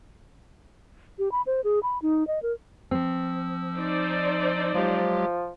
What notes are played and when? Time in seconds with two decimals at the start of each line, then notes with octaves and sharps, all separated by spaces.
1.19 G4
1.32 B5
1.47 C5
1.64 G#4
1.83 B5
2.02 D#4
2.27 D#5
2.42 A#4
2.91 F3 C4 E6
3.74 D#4 C5 D5
4.75 F3 F#3 G#3 G4